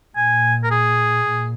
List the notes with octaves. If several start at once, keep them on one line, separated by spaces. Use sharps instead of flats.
A#2 G#5
A#4
G#4
A#2